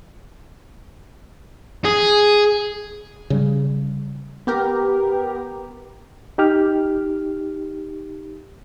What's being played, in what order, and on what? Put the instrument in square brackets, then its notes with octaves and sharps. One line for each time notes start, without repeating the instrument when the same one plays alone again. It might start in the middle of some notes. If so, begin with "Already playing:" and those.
[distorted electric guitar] G#4
[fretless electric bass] C#3 G3
[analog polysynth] B3 G4 A#4
[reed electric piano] D#4 G4 F6